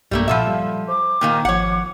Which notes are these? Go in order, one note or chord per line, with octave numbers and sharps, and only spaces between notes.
B1 G2 G3 A3 A#3
A#2 F3 A4 E5 F#5 B5
G3 F5
C5 D6
A#2 D#3 A#3 G5
G#1 F3 C#5 F#5